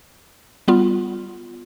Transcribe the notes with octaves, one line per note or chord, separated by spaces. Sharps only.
G3 B3 F4